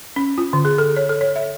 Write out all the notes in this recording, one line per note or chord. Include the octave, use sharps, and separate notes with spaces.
C#4
F4
D3
G#4
A4
C#5
A4
C#5
E5